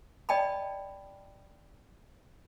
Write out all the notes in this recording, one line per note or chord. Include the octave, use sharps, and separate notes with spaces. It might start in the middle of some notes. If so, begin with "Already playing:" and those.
D5 D#5 G5 A5 B5